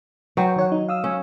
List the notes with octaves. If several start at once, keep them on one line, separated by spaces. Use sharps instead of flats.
F#3 B4 C#5 G5
D#3 C#5 F#5
D#4
F5 D#6 E6
C#4